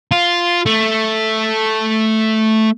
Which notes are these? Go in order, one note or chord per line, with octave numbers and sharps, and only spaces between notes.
F4
A3